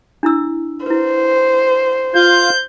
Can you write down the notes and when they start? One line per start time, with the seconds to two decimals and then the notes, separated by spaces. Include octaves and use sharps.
0.23 D4 E4 E6
0.86 E4 B4 C5
2.15 F4 F5 G6